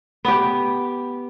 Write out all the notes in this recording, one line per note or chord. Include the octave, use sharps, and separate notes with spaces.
B3 G4